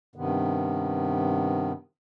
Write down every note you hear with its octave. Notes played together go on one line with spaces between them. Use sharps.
G2 C3 D#3 B3